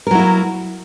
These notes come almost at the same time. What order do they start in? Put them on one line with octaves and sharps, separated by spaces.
A#4 F#3 E4 A#3